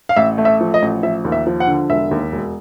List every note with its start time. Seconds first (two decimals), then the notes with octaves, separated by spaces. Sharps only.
0.09 F5
0.16 A1 E5
0.38 A3
0.45 E5
0.61 F3
0.74 D#5
0.82 A1
1.03 F3 E5
1.25 D#2
1.32 E5
1.47 F3
1.60 F#5
1.67 D3
1.90 E1 E5
2.11 D#2
2.32 E1